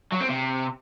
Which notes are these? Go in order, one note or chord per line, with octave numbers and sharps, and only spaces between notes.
F#3
C4
C3